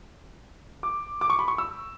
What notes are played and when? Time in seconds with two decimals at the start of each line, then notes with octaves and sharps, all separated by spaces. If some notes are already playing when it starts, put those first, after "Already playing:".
0.83 D6
1.21 D6
1.30 C#6
1.39 B5
1.48 C#6
1.58 E6